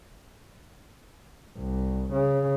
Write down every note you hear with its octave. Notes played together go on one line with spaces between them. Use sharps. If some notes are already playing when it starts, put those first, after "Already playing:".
C2
C#3